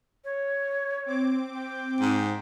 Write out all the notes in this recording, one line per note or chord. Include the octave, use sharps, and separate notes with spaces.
C#5
C4 D6
G5
G#2